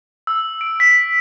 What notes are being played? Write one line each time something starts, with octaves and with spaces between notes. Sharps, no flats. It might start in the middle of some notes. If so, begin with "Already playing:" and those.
E6
D7
B6